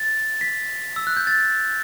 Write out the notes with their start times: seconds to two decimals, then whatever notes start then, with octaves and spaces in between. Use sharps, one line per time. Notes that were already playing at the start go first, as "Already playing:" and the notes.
Already playing: A6
0.41 B6
0.96 E6
1.07 F#6
1.17 G6
1.27 A6